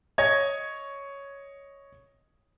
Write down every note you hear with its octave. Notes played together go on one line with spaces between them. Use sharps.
C#5 D#5 G#6